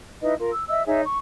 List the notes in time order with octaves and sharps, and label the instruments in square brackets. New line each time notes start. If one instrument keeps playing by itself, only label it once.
[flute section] D#4 E4 B4 D#5
F4 A#4
E6
D#5 E5 E6
D#4 G#4 C#5 E5
C#6